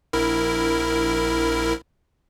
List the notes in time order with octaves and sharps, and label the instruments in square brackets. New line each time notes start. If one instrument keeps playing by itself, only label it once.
[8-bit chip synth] A#1 E4 A#4